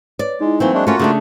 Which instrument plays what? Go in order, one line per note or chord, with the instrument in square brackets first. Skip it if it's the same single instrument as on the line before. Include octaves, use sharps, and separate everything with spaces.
[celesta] B4 C#5 [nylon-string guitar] D5
[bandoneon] G#3 [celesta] D#4 E4
[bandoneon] E3 A3 [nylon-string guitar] F#3 A#3 C4
[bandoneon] G#3 D4 [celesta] E5 C#6 F#6
[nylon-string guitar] A3 C#4 [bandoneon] A#3 F4 F#4
[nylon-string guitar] C#3 A3 D4